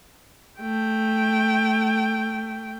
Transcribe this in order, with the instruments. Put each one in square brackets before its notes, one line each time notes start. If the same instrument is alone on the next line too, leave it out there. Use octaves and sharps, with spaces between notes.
[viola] A3 G5